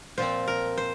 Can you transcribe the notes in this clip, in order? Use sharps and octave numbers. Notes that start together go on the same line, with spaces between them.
A#2 F3 C4 C5
A#4
C5